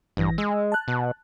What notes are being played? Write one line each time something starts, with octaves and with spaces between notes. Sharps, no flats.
A1 G2 E3 A#6
G#3 E6
A5 F#6
B2